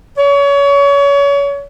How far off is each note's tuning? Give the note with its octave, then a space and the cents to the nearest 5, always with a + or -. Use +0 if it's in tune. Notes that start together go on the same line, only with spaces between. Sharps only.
C#5 +30